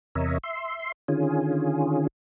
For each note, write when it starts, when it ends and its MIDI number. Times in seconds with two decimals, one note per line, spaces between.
0.15 0.38 40
0.15 0.38 48
0.15 0.38 70
0.15 0.38 73
0.15 0.38 75
0.15 0.38 76
0.44 0.92 76
0.44 0.92 84
1.08 2.07 50
1.08 2.07 51
1.08 2.07 61
1.08 2.07 65
1.08 2.07 68